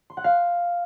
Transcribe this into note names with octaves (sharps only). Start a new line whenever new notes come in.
C6
F#5
F5